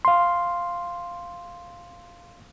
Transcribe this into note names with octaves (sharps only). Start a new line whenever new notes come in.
F5 C6